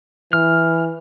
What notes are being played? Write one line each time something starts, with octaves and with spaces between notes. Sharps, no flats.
E3 F6